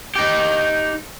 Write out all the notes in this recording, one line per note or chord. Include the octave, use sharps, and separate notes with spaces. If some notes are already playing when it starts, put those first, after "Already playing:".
D#4 G4